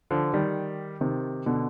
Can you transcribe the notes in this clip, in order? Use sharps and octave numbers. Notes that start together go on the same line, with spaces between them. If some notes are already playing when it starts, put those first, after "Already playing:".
D3 F3
D#3 G3
C3 D#3
B2 D3